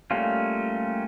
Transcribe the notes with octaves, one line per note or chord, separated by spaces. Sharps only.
G3 A3 A#3 C#4 F4